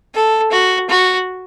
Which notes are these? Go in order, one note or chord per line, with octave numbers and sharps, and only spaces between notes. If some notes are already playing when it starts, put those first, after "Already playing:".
A4
F#4
F#4